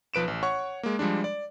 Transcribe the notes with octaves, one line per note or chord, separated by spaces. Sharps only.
B1 F3 B4 D7 E7
A1
C#5 F#5 C#6
G#3 A#3
F3 G3 G#3 D4
D5